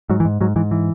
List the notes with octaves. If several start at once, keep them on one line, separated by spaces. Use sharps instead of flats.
G#2 F#3
E3
G#2
G#2 F#3
G#2 E3
E3